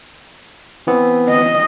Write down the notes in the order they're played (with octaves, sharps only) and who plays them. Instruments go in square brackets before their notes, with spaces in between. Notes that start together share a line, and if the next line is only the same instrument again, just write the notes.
[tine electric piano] E3 B3 C4
[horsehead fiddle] D#5